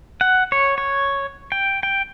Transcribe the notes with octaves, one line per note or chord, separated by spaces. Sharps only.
F#5
C#5
C#5
G5
G5